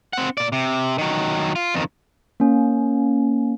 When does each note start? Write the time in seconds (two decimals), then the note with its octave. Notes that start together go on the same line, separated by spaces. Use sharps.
0.13 C4 F#5
0.38 A#2 D5
0.52 C3
0.98 D#3 F#3
1.56 F4
1.74 F2 D#3
2.40 A#3 C#4